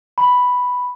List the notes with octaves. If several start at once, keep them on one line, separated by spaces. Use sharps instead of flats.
B5